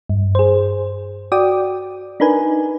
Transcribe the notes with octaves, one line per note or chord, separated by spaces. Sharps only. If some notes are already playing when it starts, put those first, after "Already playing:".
G2
G#4 C5
F#4 D5 G5 D6 D#6
D4 D#4 A#4 B4 G#5